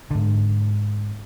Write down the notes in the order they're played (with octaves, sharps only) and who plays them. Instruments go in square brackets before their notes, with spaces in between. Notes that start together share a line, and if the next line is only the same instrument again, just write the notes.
[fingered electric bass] G#2 D3